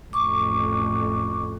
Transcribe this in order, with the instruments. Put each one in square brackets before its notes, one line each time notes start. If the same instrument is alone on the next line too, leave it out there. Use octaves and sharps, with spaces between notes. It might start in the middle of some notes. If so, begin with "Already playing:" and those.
[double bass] A1 F2 [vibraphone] C#6 D6